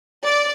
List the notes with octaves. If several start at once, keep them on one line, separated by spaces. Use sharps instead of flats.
D5